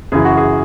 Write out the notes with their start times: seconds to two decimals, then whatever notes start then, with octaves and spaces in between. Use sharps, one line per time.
0.12 F#2 C#3 E3 G#4
0.25 F#4
0.37 G#4